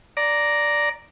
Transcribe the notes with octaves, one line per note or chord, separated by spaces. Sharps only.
D5 A#5